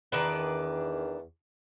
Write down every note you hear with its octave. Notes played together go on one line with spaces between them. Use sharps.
E2 D#3 D4 B4